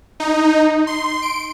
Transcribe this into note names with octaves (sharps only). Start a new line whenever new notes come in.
D#4
C6
D7